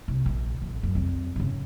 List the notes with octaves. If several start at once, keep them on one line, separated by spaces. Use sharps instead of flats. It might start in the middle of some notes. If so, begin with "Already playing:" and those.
C2
A#1
A1 F2
F#2
F2 G3
G#2 C#3